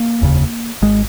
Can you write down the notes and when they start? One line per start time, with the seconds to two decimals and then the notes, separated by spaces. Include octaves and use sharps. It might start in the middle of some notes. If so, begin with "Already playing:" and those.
Already playing: A#3
0.22 F1 D#2 C#3
0.82 G#1 G#3